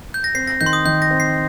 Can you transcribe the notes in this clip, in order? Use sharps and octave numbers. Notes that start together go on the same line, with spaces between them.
G6
A#6
C4 C7
A#6
D#3 G6
C6
D#6
D#3 G6
A#6
C4
C7